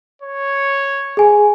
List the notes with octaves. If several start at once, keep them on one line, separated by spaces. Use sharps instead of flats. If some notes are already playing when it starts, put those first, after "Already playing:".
C#5
G#4 G#5